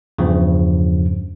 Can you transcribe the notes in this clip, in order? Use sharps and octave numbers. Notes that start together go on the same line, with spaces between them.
E2 G2 C#3 F3